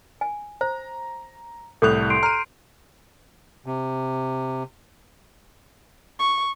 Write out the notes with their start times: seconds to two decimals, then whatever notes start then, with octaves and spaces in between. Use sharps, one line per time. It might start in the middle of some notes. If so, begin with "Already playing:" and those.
0.21 G#5
0.61 C5 A#5
1.82 C2 A2 A4 D#6 F#6 G6 F7
2.10 C6 C7 D7
2.23 A#5 F6 D#7
3.66 C3
6.19 C#6